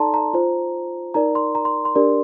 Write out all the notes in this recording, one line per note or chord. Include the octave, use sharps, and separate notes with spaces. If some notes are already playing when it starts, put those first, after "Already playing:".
Already playing: D#4 A4 D5 A5 A#5 C6
A#5
F4 C5
D#4 A#4 D5 A#5
C6
A#5
C6
C6
D4 G4 A#4 D5